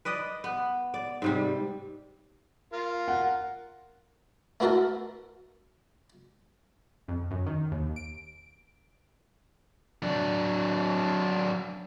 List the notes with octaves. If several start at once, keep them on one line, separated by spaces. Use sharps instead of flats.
B4 D5 D#5
B3
D5
G#2 C3 G3
F4 A#4
F#5
A3 B3 E4 F#4 A4 A#4
F2
F#2
D#3
D#2
D7
F#3 D4